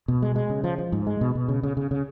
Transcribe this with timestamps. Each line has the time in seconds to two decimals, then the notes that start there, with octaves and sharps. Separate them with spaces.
0.08 B2
0.22 G#3
0.36 G#3
0.50 C#3
0.64 F3
0.78 F3
0.92 G#2
1.07 G#3
1.21 B2
1.35 B2
1.49 C#3
1.63 C#3
1.77 C#3
1.91 C#3